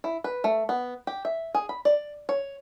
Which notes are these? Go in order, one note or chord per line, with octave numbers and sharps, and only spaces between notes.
E4
B4
A3
B3
G4
E5
G#4
B5
D5
C#5